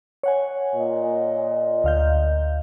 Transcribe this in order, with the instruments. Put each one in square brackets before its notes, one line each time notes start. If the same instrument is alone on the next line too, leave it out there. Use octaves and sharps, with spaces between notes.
[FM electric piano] C#5 F#5 G#5
[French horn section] A#2 D#5
[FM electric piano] D2 F5 G6